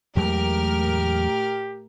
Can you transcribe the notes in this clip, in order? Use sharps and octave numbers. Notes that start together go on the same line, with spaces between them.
E2 A2 F#3 G#3 G4 A#4 F6